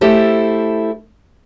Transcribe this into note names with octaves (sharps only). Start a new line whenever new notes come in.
A3 E4 G4 A4 C5